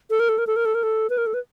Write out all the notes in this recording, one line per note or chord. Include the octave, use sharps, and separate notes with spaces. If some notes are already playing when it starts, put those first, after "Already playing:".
A4
A#4
A4
A#4
A4
A#4
A4
A#4
A4
B4
A#4
A4
B4